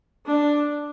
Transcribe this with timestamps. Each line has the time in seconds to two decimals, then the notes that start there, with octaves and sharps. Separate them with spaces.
0.26 D4